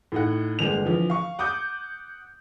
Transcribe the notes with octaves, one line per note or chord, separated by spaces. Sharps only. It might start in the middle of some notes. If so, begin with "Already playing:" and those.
A2 D#4 F#5
G1 G#3 A#3 F7
D3 E3 F3
F5 C#6
F#5 D6 D#6 G6